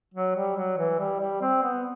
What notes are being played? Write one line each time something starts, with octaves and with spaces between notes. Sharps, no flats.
F#3
G3
F#3
E3
G3
G3
C4
B3